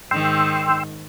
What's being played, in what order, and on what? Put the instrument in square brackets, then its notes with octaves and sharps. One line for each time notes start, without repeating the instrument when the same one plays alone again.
[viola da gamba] G#2 D#3 [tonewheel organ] G5 C6 E6